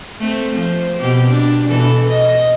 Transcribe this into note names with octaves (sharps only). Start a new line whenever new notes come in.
A3 C4
F3 C5
B2 C4 G4
D4
B2 E3 A4
D#5